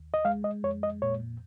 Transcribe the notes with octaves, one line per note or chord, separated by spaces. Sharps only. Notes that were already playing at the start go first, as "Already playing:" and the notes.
Already playing: D#2
D#5
G#3 F5
D#5
F2 C#5
D#5
A#2 C#5